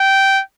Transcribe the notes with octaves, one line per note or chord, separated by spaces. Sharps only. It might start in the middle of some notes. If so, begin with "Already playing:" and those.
Already playing: G5